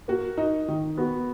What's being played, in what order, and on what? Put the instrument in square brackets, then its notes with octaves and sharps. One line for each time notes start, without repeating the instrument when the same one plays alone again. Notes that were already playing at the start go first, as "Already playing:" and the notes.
[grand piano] A#3 [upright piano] F#4
[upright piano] D#4
D#3
[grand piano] B3 [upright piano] F#4